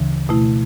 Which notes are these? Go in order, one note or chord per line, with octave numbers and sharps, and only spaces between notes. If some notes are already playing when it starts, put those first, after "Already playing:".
Already playing: D2 C#3 E3
B2 A3 E4